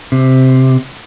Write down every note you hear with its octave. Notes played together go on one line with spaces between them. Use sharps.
C3